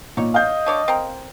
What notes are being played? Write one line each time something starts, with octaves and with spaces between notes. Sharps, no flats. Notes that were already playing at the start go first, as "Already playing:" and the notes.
A#2 D#4 C#5
D#5 F5 G6
D3 C#5 D5
C4 A#4